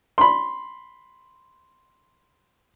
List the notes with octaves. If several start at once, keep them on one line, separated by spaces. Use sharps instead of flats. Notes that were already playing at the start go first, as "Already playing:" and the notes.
B5 C6